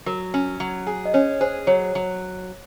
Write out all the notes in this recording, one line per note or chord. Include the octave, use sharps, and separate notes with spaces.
F#3 A#4
C#4
F#3
G#4
D#5
C#4 C#5
G#4 C5
F#3 C#5
F#3